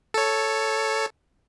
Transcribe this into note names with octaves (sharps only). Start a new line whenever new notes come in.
A4 C#5